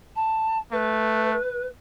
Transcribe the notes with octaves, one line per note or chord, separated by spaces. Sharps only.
A5
A3 B4